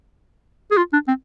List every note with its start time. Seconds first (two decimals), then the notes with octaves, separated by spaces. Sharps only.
0.71 G#4
0.77 F4
0.93 D4
1.08 C4